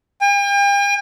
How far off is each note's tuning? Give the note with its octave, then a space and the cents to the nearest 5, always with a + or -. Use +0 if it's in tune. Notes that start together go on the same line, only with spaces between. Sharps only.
G5 +45